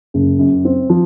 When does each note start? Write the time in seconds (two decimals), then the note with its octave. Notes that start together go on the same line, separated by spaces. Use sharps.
0.14 F#1
0.39 F#2
0.65 C4
0.90 F3